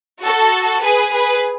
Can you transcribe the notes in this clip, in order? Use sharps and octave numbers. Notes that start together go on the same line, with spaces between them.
F#4 A4
G#4 B4
G#4 B4